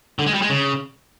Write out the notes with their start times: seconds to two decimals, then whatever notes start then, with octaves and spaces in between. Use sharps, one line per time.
0.19 D3
0.26 G#3
0.34 G3
0.42 G#3
0.49 C#3